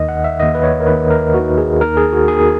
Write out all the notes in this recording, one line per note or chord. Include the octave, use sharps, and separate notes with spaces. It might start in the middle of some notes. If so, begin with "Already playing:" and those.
Already playing: D#2 D#3 D#5
F#5
E5
D#2 D#3 D#5
B4
C#5
A#4
D#2 D#3 B4
A#4
D#2 D#3 F#4
G#4
D#2 D#3 A#4
G#4
F#4
D#2 D#3 G#4